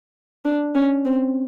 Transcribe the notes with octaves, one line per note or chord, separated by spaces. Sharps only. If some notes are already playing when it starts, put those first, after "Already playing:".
D4
C#4
C4